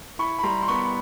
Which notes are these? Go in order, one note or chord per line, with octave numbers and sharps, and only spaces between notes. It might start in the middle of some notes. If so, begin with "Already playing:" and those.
E4 B5 C#6
B5
G3 A#5 C6
C6
B3 B5 C#6